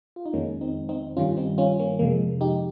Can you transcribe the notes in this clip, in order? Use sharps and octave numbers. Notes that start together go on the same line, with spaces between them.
F4
D#4
F2 D#3 G#3 A#3 C#4
C4 D#4
C4 D#4
G2 D#3 G3 C#4 F4
C4 D#4
C#4 F4
A#3 C#4
F2 C3 F3 G#3 A#3
D#4 G4